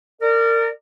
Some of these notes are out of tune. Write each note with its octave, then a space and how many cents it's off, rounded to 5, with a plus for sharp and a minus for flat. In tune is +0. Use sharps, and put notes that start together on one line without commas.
A#4 -25 D5 +10